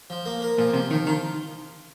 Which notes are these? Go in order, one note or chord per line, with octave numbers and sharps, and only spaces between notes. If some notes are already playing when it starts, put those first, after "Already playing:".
F3
A#3
A#4
A#2 F3
C3 F3
D#3 F3
D#3 F4